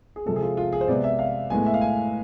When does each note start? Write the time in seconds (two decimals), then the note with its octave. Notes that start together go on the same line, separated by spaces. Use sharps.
0.16 G#4
0.26 C3 F3 G#3 A4
0.36 G#4
0.42 F4
0.57 F4
0.73 G#4
0.81 C5
0.88 C3 G#3 B3 D5
1.04 E5
1.19 F5
1.50 A2 G#3 B3 G#5
1.66 E5
1.74 F5
1.81 G#5